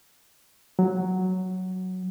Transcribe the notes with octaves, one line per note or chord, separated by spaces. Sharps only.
F#3